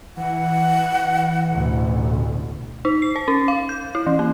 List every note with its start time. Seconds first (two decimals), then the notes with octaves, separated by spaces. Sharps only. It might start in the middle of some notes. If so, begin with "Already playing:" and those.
0.17 E3 F#5
1.51 A1 D2 B2
2.85 D#4
3.02 C7
3.16 C5
3.28 C#4
3.48 F5
3.69 G6
3.95 E4
4.06 E3
4.19 A#3